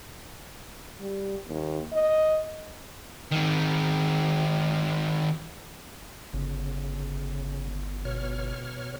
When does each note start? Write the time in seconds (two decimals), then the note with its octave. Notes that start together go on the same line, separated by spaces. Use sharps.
1.00 G3
1.47 D#2
1.93 D#5
3.32 D#3 C4
6.33 G1 C#3
8.05 B2 C#5 F6